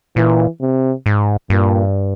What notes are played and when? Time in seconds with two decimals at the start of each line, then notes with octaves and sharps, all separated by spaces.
0.16 A#2 E3
0.61 C3
1.06 G#2
1.50 G2 A#2